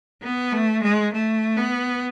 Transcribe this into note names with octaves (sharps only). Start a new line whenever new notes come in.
B3
A3
G#3
A3
B3